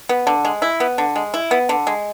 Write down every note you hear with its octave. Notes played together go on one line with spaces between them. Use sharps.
B3
D3
G#3
E4
B3
D3
G#3
E4
B3
D3
G#3